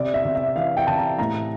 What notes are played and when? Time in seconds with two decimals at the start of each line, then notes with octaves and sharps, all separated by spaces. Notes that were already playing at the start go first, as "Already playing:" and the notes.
Already playing: C3 D5
0.14 E5
0.25 C3
0.35 E5
0.56 E3 F5
0.77 G5
0.87 C3 A5
0.98 A#5
1.18 A2 A#5